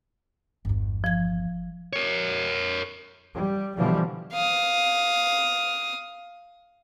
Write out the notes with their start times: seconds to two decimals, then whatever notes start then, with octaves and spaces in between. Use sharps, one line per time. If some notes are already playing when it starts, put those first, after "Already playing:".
0.65 G1 E2
1.04 F3 G#6
1.93 A#4 C#5
3.35 G3
3.76 B2 D3 E3 F3 G3
4.33 F5 D#6